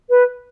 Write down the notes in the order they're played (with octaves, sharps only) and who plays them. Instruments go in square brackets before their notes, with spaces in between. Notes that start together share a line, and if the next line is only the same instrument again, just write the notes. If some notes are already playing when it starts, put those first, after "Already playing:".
[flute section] B4